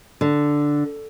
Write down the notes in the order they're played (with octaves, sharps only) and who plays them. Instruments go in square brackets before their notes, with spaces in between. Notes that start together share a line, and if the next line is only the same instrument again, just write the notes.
[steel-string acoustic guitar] D3